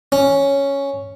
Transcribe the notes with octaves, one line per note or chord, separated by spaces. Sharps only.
C#4